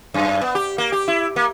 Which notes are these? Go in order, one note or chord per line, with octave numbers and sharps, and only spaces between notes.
F#2
B3
G4
A#3
G4
E4
A#3